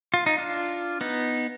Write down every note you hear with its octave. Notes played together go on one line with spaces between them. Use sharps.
F4
D#4
D4 F4
B3 D#4